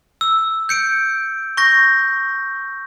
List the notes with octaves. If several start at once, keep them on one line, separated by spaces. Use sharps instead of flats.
E6
G6 C#7 D7
C#6 G6 A#6